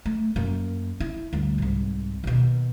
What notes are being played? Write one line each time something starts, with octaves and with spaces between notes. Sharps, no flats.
A3
F#2 A#3
E4
D2 G2
C2 G#2
D#2 B2